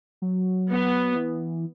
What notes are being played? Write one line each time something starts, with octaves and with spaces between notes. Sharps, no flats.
F#3
B3
E3